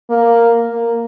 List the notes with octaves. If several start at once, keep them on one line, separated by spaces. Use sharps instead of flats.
A#3
A#3